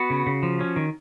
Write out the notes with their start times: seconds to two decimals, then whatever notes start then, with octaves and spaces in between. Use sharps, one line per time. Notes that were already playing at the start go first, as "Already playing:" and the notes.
Already playing: B3 F#4
0.10 C#3
0.27 C#3
0.43 F3
0.60 C#4
0.76 D#3